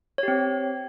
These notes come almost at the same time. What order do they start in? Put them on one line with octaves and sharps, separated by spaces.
C#5 G4 C4